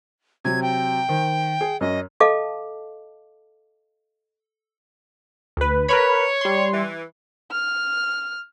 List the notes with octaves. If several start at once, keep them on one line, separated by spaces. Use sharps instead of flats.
C3 F#3 G#6
G5
D#3 C5
G#4
F#2 C#4 D#5
A4 D#5 F5 A5 D6
D2 B4
A#4 B4 C#5 B5
G3 C6
E3
F6